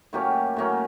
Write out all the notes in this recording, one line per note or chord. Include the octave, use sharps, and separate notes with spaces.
A2 F#3 A#3 C#4 G4
A2 F#3 A#3 C#4